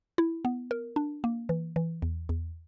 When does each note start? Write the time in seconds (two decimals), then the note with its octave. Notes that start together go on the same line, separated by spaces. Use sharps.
0.18 E4
0.45 B3
0.71 A#4
0.96 D4
1.24 A#3
1.49 E3
1.76 E3
2.02 E2
2.29 E2